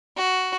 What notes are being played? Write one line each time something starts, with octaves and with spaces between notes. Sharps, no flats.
F#4